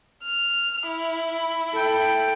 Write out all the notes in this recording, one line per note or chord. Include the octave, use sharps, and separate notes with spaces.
F6
E4
A4 G5